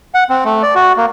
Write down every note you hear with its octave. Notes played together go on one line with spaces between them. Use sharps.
F#5
C4
A3
D5
F#4
A#3